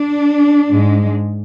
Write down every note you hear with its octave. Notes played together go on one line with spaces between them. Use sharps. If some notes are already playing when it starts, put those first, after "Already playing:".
Already playing: D4
G#2 G#3